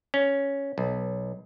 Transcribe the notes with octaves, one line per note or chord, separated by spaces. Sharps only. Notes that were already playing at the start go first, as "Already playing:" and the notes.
C#4
B1